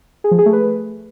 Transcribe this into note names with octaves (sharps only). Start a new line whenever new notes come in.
G#4
F3
G#4
A3
B4